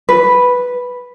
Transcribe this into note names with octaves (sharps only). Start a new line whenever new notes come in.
B4